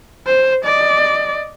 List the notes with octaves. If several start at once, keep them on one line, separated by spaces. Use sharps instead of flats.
C5
D5 D#5